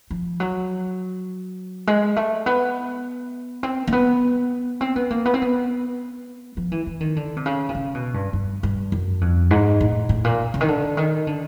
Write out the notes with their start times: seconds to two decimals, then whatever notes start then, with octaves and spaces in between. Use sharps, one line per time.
0.11 F3
0.40 F#3
1.87 G#3
2.16 A3
2.46 B3
3.63 C4
3.87 A#3
3.93 B3
4.81 C4
4.96 B3
5.10 A#3
5.25 B3
5.34 C4
5.42 B3
6.57 F3
6.72 E3
6.86 E3
7.00 D#3
7.16 D3
7.37 C3
7.46 C#3
7.69 C3
7.75 C#3
7.95 B2
8.14 G2
8.33 G2
8.63 G2
8.92 F#2
9.21 F2
9.51 G#2
9.81 A2
10.09 A2
10.24 A#2
10.54 C#3
10.61 D#3
10.68 D3
10.97 D#3
11.27 D3